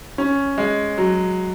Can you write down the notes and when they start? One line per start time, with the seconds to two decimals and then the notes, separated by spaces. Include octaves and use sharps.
0.18 C#4
0.58 G#3
0.98 F#3